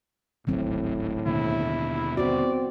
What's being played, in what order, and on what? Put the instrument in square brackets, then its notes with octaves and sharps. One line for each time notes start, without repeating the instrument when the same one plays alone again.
[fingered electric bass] D1 G#1 [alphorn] A2 [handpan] D#3 F#3 C4
[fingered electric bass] D#2 B2 D3 [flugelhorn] E4
[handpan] B3 F#4 [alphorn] C4 [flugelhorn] D5